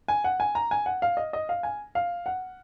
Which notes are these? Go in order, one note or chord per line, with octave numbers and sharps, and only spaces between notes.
G#5
F#5
G#5
A#5
G#5
F#5
F5
D#5
D#5
F5
G#5
F5
F#5